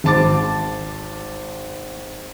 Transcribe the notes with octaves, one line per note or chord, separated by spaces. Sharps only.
G#1 C5 A5 D6 A6